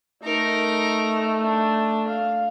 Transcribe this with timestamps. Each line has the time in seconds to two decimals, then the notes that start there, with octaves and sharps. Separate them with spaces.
0.24 A3 D#4 A#4
1.43 D4
2.08 F5